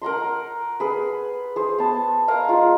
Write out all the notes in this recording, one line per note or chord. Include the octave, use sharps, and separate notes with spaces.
A#4 F#5 A#5 C6
G#4 B4
G#4 C5
B3 A5
A#4 F5 G#5 A#5
G#3 F4